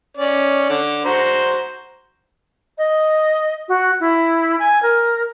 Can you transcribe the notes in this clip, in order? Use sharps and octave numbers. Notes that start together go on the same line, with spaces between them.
C#4 D5
D3 D6
F#4 C5 A#5
D#5
F#4
E4
G#5
A#4